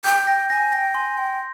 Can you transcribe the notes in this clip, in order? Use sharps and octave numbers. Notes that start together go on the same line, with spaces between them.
G5 G6
A#6
G#5 A#6
G5 A#6
G#5 C6
G5 C6